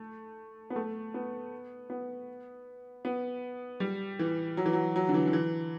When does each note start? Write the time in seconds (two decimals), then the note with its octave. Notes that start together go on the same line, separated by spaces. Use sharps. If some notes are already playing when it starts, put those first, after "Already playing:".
Already playing: A3
0.70 B3
0.76 A3
1.14 B3
1.90 B3
3.05 B3
3.80 G3
4.19 E3
4.57 F#3
4.66 E3
4.73 F#3
4.96 F#3
5.09 D3
5.14 E3
5.27 D3
5.33 E3